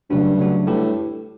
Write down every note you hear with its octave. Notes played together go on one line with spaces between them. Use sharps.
G2 C#3 F#3 A3 D4 F#4
C#3 F#3 A3 D4 F#4
A2 G3 D4 G4 B4